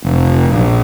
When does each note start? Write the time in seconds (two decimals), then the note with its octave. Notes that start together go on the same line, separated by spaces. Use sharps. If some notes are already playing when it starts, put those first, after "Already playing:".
0.04 F1
0.53 A#1